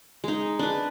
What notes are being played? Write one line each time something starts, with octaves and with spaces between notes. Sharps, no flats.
G#3 D#4
D4 B4